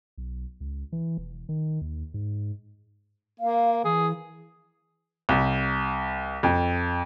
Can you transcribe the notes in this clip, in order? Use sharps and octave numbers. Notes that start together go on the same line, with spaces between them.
B1
C#2
E3
E1
D#3
D#2
G#2
A#3 F5
E3 G#4
C2
F2